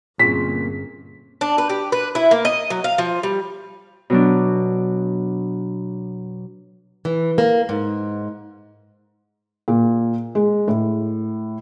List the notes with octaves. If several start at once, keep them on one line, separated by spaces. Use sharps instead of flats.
G1 A#2 C4 C#4 G#4 B6
D4
B4
G4
B4
E4
A#3
D#5
F#3
F5
F3
G3
B2 F#3 D4
E3
A#3
G#2
A#2
G#3
A2